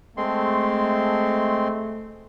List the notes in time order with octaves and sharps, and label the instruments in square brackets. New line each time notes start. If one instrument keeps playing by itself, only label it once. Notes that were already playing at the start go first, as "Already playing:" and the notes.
[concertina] G#3 C4 C6 [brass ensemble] A3